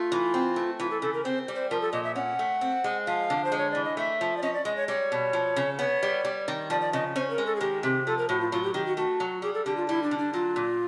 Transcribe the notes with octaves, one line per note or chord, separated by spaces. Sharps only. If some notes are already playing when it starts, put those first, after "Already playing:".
Already playing: A3 F4
E3
C4
A3
E3 F4
A4
C#3 A4
A#4
C4 C5
G3
C5
F3 A#4
A4
A#2 D#5
E5
C#4 F#5
A3
C4
G#3
F3 F5
D3
C5
G#3
C#5
E3 D5
D#5
A3 E5
F3
D5
C#4 D#5
D5
G#3 D#5
C#5
G3 C#5
B2
F3
C#3
B3 C#5
G3
G3
D#3
F3 D5
D5
C#3 D#5
C#4 C5
A#4
G#3
A4
G#4
D#3 G4
C3 G4
F3 A4
A#4
A2 F#4
F4
F#3 F4
G4
D#3 G4
F#4
A3 F#4
F#3
G3 G#4
A4
D3 G4
F4
G3 E4
D4
D3
D4
F#3 F4
A#2